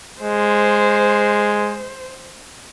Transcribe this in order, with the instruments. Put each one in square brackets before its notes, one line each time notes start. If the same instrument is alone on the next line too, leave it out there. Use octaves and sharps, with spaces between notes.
[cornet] G#3 [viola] C5